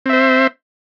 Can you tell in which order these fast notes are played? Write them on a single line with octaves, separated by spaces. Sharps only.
C4 E5 C5